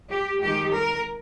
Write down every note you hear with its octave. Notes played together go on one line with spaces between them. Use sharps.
G4
D#3 G#3 G4
A#4